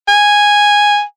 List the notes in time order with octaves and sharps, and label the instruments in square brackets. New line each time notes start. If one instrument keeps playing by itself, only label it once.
[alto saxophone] G#5